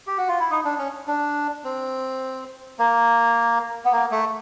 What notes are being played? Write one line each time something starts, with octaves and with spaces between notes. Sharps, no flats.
G4
F#4
F4
E4
D#4
D4
C#4
D4
C4
A#3
B3
A#3
A3